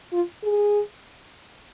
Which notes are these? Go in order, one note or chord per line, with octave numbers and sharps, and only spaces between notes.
F4
G#4